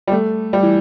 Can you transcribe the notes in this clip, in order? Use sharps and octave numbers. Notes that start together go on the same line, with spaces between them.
G3
A3
G3
E3